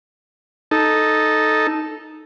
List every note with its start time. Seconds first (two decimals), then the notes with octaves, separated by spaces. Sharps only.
0.71 D#4 A4